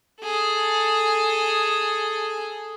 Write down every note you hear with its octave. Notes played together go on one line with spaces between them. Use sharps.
G#4 A4